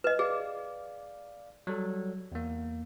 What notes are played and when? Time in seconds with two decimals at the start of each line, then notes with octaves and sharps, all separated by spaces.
0.04 B4 D#5
0.19 G#4 D5 F5
1.67 F#3 G3 A4
2.32 E2 A#3